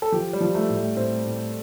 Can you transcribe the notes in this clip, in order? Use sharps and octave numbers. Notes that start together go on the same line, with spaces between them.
A4
F3 G4
G3
F3
A3
A2
A3
A2 C4
A2